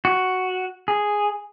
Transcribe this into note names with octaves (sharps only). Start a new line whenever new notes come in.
F#4
G#4